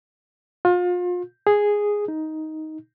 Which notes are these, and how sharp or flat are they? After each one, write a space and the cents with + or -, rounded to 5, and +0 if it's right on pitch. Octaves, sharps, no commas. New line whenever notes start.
F4 +35
G#4 -5
D#4 +10